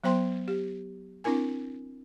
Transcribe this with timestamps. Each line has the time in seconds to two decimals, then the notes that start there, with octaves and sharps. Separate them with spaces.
0.04 F#3 B3 C5 G5 C6
0.48 G4
1.24 C4 D4 E4 A#4 G#5